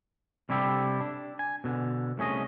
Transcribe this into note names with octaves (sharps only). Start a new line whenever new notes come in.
C3 G3 D4 E4 G4 A4
D4
G#5
B2 D3
C2 A3 C#4 G#4 D#5